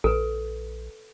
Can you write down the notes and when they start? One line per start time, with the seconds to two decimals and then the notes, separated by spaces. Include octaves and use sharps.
0.04 A#1 A4 B4